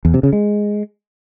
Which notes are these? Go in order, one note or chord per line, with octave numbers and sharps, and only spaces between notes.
E2
C3
C#3
G#3